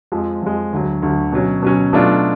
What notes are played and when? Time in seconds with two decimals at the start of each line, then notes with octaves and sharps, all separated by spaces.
0.12 F2 F3 G#3
0.42 F2 F3 G#3
0.73 D2 D3 F#3
1.02 D2 D3 F#3
1.32 B2 F#3 C#4
1.62 B2 F#3 C#4
1.93 B2 F#3 A3 D4 F4